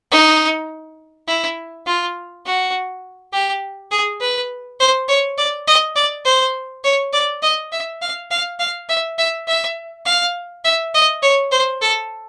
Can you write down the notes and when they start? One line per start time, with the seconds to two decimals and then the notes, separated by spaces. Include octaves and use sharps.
0.12 D#4
1.28 E4
1.86 F4
2.46 F#4
3.33 G4
3.91 G#4
4.21 B4
4.80 C5
5.09 C#5
5.38 D5
5.67 D#5
5.96 D5
6.25 C5
6.84 C#5
7.13 D5
7.43 D#5
7.72 E5
8.02 F5
8.31 F5
8.60 F5
8.89 E5
9.19 E5
9.48 E5
10.06 F5
10.64 E5
10.95 D#5
11.23 C#5
11.52 C5
11.82 A4